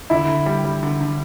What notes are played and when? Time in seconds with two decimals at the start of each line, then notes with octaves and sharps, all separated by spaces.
0.10 D3 E4
0.28 D3
0.46 G3
0.64 G3
0.83 D3
1.01 D3